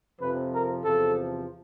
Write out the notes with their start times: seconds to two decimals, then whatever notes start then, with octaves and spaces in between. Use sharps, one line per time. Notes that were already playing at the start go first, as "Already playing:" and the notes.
0.20 F2 C3 F3 B4
0.52 A#4
0.83 E2 C3 F3 A4